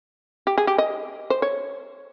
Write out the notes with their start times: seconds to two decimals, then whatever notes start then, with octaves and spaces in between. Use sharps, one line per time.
0.47 G4
0.58 G#4
0.67 G4
0.78 D#5
1.30 C5
1.42 C#5